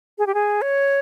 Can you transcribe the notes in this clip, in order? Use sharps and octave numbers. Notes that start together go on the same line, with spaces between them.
G#4
G4
G#4
C#5